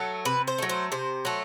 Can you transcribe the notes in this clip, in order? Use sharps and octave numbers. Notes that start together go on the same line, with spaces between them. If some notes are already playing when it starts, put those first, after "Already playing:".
Already playing: F#3 A3
C3 B4
C5
F#3 A3
C5
C3 C5
F#3 A3